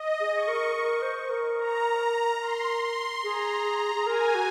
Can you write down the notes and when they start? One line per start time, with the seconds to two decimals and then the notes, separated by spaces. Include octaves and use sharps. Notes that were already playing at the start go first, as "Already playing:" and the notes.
Already playing: D#5
0.20 G#4
0.34 C#6
0.48 A#4
0.76 A#4
1.02 C5
1.30 A#4
1.58 A#5
2.41 C6
2.83 C6
3.24 G#4 A#5
3.95 G#4
4.06 A#4 G#5
4.35 F#4